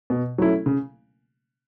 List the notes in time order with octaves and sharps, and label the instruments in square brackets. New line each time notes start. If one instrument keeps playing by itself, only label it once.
[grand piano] B2
F#3 A3 C#4 E4
C#3